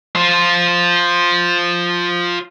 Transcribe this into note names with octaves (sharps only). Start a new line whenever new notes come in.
F4 C5